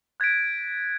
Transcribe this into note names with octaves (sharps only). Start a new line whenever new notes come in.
F#6 G#6 A6 B6 D7